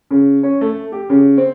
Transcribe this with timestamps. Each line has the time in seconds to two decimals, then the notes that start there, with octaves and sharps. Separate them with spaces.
0.11 C#3
0.43 C#4
0.61 A3
0.92 G4
1.10 C#3
1.38 C4